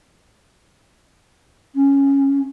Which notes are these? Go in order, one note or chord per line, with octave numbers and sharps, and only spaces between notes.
C#4